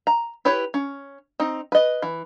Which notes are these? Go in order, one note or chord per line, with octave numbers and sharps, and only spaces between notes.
A#5
E4 G4 B4 C#5
C#4
C4 D#4
B4 D#5
E3